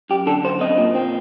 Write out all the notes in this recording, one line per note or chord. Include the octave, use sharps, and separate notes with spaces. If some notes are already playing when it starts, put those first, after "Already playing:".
F#2 G4
D3 A4
F#2 C5
C4 D#5
A#2
C4